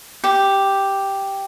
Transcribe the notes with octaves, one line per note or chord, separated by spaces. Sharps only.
G4